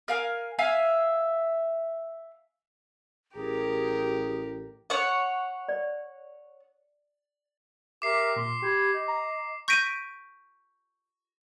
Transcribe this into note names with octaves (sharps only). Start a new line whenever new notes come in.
A#4 F5 G#5
E5 F5 G#5
A1 G4 G#4 A#4
C#5 F#5
D5
G4 A#4 E5 D6 C7
A#2 C6
G4 B5 G6 G#6
D#5
A#5
C#6 G6 A#6 B6 D7 D#7